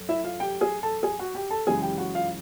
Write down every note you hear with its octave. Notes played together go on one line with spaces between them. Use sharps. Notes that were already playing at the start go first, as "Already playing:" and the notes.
Already playing: F#2 A3
E4 E5
F4 F5
G4 G5
G#4 G#5
A4 A5
G#4 G#5
F#4 F#5
G4 G5
A4 A5
F#2 C#3 E3 G#3 G#4 G#5
G4 G5
F#4 F#5
F4 F5